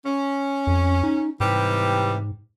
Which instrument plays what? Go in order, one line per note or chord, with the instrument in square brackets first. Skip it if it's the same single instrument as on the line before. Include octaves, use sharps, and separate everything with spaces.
[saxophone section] C#4
[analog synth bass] F2
D#4
[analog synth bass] G#2 [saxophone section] C3 E3 G3